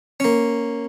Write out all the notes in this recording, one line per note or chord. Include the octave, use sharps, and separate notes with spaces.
A#3 C#4